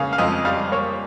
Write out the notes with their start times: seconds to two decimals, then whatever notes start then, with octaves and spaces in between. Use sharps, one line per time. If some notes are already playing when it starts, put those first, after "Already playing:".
Already playing: C#3 A#3 F5
0.13 F5
0.18 F2 D#5
0.45 G3 F5
0.72 A#3 C#5